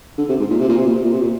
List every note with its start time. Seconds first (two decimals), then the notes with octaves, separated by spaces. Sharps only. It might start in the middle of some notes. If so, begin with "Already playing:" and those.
0.18 D3
0.29 C3
0.40 G#2
0.50 A#2
0.60 C3
0.69 A#2
0.78 C3
0.86 A#2
0.94 C3
1.04 A#2
1.13 C3
1.21 A#2